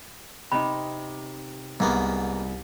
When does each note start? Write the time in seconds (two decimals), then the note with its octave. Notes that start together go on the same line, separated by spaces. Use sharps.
0.52 C3 D#4 B5
1.80 C2 G#2 A#3 B3